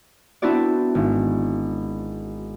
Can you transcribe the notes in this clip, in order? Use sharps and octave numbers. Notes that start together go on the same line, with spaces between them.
B3 C4 D4 E4 F#4 D5
G#1